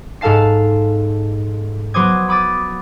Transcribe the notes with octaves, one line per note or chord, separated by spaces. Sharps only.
G#2 A4 F5 A5 C7
F#3 B3 C5 D6 D#6 G#6
B5 D6 D#6 A6